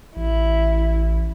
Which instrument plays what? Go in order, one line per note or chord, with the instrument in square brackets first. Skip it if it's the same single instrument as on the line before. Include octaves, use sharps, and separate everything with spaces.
[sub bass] A1 [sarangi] E4